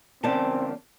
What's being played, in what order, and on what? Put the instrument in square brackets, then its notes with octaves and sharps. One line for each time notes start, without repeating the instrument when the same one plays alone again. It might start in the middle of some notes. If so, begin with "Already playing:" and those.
[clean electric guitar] E2 C#3 A#3 [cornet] C4 [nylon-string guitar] D5 A5